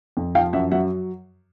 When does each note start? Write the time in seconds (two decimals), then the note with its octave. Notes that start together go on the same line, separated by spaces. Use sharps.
0.17 F2
0.35 F3 F5 G5
0.53 F#2 E5 F#5
0.71 F#3 E5 F#5